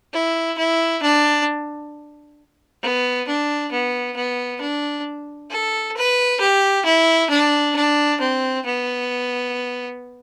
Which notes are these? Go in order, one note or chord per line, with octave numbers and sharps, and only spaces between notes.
E4
E4
D4
B3
D4
B3
B3
D4
A4
B4
G4
E4
D4
D4
C4
B3